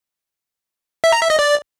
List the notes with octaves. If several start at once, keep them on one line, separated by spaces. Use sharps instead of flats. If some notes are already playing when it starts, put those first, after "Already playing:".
E5
A#5
E5
D#5
D5